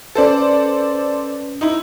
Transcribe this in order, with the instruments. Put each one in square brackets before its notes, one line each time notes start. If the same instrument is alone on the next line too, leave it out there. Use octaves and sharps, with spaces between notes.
[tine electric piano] C#4 B4 [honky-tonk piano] A4 C5 D5
[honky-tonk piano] D#4 E4